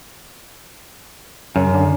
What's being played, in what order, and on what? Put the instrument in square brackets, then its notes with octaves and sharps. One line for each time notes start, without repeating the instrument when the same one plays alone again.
[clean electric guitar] F#2 [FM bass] C#3
[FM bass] D3